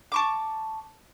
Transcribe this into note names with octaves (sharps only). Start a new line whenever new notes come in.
A5 C#6 D6